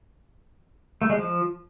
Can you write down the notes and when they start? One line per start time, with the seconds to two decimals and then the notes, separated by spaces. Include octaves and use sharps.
1.02 A3
1.10 G#3
1.18 F3